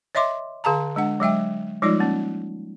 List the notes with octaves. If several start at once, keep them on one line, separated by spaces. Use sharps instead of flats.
C#5 D#5 E5 C6 D6
D3 G#4 F5 A5 A#5
G#3 D4 F#5
F#3 G#3 E5 G5
F3 G3 G#3 D#4 F4 D5
A#3 C#4